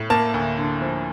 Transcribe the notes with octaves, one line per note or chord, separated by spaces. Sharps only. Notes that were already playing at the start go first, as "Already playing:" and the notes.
Already playing: A2
A#3 A5
D2
D3
F3